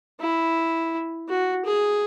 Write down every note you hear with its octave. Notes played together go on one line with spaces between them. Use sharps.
E4
F#4
G#4